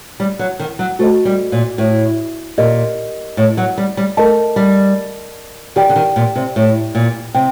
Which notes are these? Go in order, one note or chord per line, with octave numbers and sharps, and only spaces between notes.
G3
F#3
D#3
F#3
A3 F#4 C5 D#5
G3
A#2
A2
A#2 G4 A#4 D#5
A2
F#3
G3
G3
A3 A#4 D#5 A5
G3
D#3 G4 D5 G5
D3
D#3
A#2
C3
A2
A#2
C3 G5